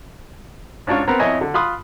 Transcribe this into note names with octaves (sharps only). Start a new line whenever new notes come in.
G#2 C#4 D4 F4 C#5
B3 C4 A#4 A#5
F2 E4 C#5 D#5 G#5
D3
F4 B5 C6 D#6 F#6